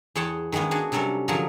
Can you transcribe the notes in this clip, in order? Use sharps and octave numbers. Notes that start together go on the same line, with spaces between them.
E2 G#4 C#5 F#5 G5 A5
D#3 G#3 A#3 B3 C#4
D4 F#4 G#4
C3 F#3 G3 C#4 A4 A#4
D3 F3 F#3 F4 G#4 A#4